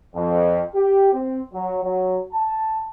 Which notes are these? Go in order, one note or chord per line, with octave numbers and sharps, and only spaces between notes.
F2
G4
C4
F#3
F#3
A5